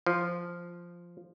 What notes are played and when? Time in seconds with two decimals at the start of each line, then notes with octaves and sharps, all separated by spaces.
0.06 F3